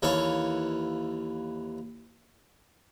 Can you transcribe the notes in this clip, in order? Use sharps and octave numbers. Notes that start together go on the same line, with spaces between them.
D#2 E3 A4 C#5 F5 C#6